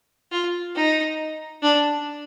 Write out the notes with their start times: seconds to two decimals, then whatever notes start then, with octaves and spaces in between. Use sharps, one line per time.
0.32 F4
0.75 D#4
1.63 D4